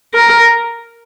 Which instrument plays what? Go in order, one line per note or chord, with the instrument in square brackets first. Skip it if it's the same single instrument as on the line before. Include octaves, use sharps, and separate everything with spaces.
[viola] A#4